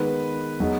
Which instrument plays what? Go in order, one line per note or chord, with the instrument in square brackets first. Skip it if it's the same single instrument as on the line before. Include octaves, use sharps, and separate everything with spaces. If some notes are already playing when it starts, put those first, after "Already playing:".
Already playing: [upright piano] D#3 G#3 B3 [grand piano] B4
[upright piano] F#3 B3 D#4 G#4